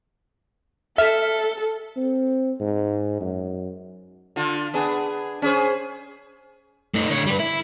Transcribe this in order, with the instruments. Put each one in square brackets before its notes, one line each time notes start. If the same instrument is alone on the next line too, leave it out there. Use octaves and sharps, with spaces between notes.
[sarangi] A4 [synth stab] E5 F6 B6
[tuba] C4
G#2
F#2
[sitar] D3 F4
B3 D4 G#4
C#4 G#4 C5
[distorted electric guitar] A3 D#4
D3 C#5
G3 B4
E4